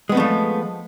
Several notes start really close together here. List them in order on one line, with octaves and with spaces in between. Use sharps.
G#3 B3 C4 A3 F3